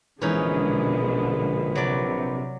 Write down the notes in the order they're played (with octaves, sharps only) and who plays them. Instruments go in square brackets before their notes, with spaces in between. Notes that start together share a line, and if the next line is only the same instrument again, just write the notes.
[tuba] A#1 [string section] B2 D3 G#3 [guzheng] E3 C#4 D#4 [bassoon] B4
[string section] C3 [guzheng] F#3 D5